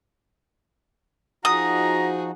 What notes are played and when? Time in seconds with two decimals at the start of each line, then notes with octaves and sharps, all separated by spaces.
1.45 F3 D#4 F#4 G#4 F#5 A#5 D#6